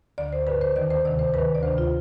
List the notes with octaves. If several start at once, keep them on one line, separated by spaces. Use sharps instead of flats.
D2 D3 D5
C5
G2 D3 B4
C5
D#2 D#3 D5
C5
D2 C3 D#3 D5
C5
G2 D#3 B4
D5
D2 C3 D#3 C5
F4